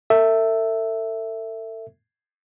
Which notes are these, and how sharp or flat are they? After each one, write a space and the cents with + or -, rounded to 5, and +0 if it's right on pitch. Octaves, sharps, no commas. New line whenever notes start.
A4 +40 E5 +0